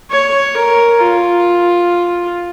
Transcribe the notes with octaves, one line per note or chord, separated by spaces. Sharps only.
C#5
A#4
F4